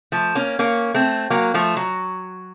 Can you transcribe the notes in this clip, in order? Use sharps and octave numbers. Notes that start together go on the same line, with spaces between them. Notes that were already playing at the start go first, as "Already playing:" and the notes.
F3 A3
A#3 C#4
A#3 C#4
A3 C4
F#3 A#3
F3 A3
F#3